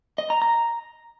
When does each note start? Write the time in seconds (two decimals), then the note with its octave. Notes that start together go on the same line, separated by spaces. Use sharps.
0.18 D#5
0.30 A#5
0.42 A#5